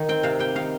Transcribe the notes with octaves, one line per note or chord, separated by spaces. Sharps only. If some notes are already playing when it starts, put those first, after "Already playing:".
Already playing: D#3
C4 G5
C3 F5
G3 G5
D#3 F5